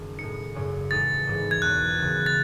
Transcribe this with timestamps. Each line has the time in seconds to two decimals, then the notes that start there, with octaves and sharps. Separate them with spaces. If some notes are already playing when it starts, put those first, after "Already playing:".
Already playing: F#1 F#2 D#3 F#3 A3 C#4 F#4
0.18 A2 G#3 D#4 C#7
0.55 G#1 F#2 C#3 F#3
0.90 A1 A2 G#3 D#4 A6
1.27 G#1 G#2 E3 B3
1.51 G#6
1.62 E2 B2 F#3 F#6
1.98 D#2 C#3 E3 B3
2.26 A6